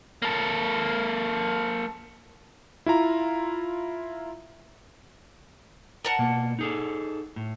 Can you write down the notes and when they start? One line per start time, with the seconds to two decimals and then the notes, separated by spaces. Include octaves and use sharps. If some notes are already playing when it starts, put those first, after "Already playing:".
0.22 A#3 A4
2.86 E4 F4 A#5
6.05 A#4 D5 F#5 A5
6.19 B2 A#3
6.59 D#4 G#4 A4
7.36 A2